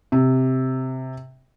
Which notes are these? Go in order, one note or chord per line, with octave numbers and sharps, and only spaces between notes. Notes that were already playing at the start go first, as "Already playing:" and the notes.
C3